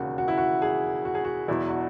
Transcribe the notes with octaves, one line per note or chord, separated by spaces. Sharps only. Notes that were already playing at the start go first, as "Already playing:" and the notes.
Already playing: E1 D#2 C#3 F#4
F#4
E4
F#4
G#4
F#4
G#4
F#4
E1 E2 B2 F#3 E4
F#4